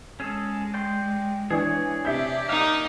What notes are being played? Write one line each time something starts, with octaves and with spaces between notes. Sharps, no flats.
G#3 C#4 G#4 A4
D5 G5 C6
E3 D4 G#4 C#5
C3 D4 G4 E5 G6
A#3 D#4 F5